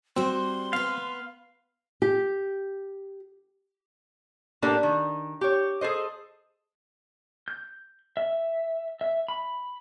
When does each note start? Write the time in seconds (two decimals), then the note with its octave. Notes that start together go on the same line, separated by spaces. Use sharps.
0.16 G3 C4 F#4 C6
0.73 B3 B4 F5
2.02 G4
4.62 A2 A#3 D4 G4 A4
4.83 D#3
5.41 G4 C#5
5.81 G#4 A4 C5 D#5
7.48 G6
8.17 E5
9.01 E5
9.28 B5